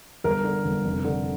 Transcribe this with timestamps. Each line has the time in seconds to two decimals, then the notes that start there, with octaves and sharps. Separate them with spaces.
0.24 G1 A#4
0.44 D3
0.65 G1
0.85 F1
1.04 D3